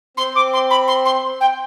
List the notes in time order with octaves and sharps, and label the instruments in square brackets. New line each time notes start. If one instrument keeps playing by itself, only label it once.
[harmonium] C4 [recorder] C6
[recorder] D6
C6
B5
C6
C6
G5